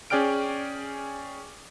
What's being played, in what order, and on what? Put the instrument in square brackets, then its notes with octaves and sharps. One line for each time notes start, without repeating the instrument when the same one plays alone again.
[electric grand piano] C#4 G#4 D5 G5 F6 D7